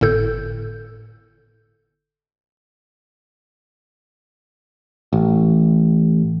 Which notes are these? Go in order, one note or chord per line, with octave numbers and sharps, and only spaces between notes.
G1 A2 A4 G6
A1